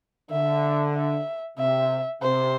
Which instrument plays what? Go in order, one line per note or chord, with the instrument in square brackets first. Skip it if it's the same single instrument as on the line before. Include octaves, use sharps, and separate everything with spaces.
[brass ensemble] D3 [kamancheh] E5
[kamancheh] E5
[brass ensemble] C3 [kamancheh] E5
[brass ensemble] C3 [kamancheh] C5